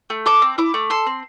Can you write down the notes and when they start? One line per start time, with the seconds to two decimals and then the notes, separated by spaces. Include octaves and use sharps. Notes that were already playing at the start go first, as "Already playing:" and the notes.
0.10 A3
0.26 A4 D6
0.42 C4
0.58 E4 D6
0.74 A3
0.90 A4 C6
1.06 C4